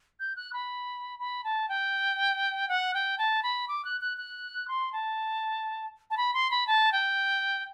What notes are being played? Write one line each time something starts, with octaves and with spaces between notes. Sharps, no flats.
G6
F#6
B5
B5
A5
G5
F#5
G5
A5
B5
D6
F#6
F#6
F#6
C6
A5
A5
B5
C6
B5
A5
G5